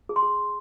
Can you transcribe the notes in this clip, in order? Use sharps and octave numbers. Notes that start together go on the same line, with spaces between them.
G#4
C6
G#4